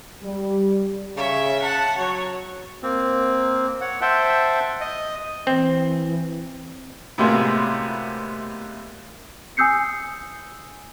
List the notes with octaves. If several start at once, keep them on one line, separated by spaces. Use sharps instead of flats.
G3
C#3 C#5 E5
F#5 A5
F#3 F#4 C#5
A#3 C4
C#5 F#5
C5 E5 F#5 G5 A5
D#5
E3 C4
A2 C3 G#3 A#3 B3 F#4
G#5 D#6 E6 G6 C7 C#7